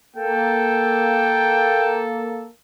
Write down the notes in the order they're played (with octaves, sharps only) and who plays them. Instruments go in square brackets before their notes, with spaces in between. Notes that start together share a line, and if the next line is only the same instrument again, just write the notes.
[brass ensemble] A#3 A4 [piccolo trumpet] G5